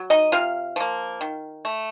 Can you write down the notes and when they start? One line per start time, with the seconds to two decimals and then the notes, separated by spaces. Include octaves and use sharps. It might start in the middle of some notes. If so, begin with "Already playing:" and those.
Already playing: F#3
0.10 D#4 D#5
0.32 C3 F4 F5
0.76 F3 A#3
1.21 D#3
1.65 A3